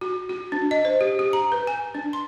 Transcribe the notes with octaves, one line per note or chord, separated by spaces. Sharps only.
F#4
F#4
D4
D#5
C5
G4
G4
A#5
B4
G#5
D4
C6